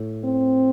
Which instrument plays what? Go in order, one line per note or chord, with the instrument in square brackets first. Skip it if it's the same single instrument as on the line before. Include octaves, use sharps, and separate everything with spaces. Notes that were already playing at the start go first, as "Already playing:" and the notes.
Already playing: [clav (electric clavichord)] A2
[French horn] C4